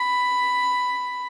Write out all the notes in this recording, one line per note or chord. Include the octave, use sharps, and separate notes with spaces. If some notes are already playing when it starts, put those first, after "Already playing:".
Already playing: B5